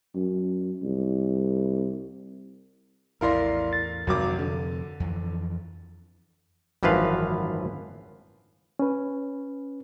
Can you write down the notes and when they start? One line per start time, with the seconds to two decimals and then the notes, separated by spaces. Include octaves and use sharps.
0.15 F#2
0.83 C2
3.21 A#1 E2 A2 E4 A#4 D5 F5 C6
3.73 A6
4.07 G#1 F2 C3 F#3 C4 D6
4.39 D3
5.00 F2 E3
6.83 G#1 F#2 E3 F3 B4 F5
8.79 C#4 B4